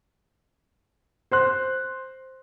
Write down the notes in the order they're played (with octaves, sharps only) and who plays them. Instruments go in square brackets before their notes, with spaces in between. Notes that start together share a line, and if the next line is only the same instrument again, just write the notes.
[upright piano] C5 C6 F#6